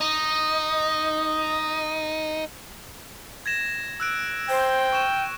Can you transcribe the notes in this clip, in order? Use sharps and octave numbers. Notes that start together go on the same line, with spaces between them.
D#4 D#5
G#6 A#6 E7
E6 F#6 D7
C5 G5
C#6 E7